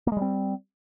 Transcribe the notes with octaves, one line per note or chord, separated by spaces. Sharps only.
G3 G#3 A#3 C4